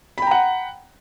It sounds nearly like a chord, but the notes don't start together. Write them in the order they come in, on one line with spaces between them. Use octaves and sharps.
B5 G5 A#5 F#5